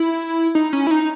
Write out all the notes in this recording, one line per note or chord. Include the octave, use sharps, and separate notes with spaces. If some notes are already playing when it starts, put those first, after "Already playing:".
Already playing: E4
D#4
C#4
E4
D#4